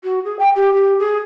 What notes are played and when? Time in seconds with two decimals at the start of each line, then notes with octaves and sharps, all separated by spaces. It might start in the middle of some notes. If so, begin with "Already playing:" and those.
0.04 F#4
0.25 G#4
0.39 G5
0.56 G4
0.74 G4
0.99 G#4